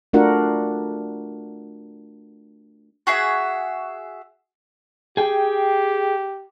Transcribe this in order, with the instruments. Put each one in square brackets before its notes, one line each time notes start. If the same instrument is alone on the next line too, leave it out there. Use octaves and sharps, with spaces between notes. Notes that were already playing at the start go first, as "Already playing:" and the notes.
[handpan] A3 D4 F4 F#4 A#4 F#5
[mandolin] F#4 G#4 E5 F#5
[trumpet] G4 [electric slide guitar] G#4 G5